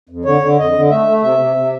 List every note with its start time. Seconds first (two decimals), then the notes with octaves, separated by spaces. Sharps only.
0.09 F2
0.25 D3 C#5
0.41 D3
0.59 F2 D#5
0.74 D3
0.90 A3 E5
1.07 A3
1.22 C3 E5
1.39 C3
1.56 C3